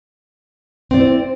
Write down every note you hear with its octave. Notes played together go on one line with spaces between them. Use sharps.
C4 E4 C5 D5